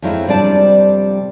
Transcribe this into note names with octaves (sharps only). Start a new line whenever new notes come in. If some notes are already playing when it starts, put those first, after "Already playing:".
F2 F3 F#3 G#3 E4 D#5
F2 C3 G3 D4 D5 A5